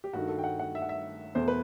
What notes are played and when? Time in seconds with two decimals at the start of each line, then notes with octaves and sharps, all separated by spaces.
0.04 G4
0.13 G2 D#3 A3 F#4
0.29 A4
0.38 G5
0.44 F#5
0.59 F#5
0.75 E5
0.82 F#5
0.89 E5
1.35 E2 B2 A3 C5
1.48 B4